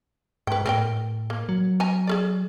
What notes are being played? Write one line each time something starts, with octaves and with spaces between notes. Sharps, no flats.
G#2 B4 G5
A2 C4 A#4 G5
A#3
F#3
D#5 G#5 A#5
G#4 A#4 D5